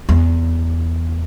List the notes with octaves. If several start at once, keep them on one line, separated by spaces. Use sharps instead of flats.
E2